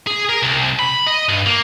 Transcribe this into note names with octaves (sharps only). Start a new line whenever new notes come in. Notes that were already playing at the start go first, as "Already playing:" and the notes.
G#4
A#4
C2
B5
D#5
G2
A#3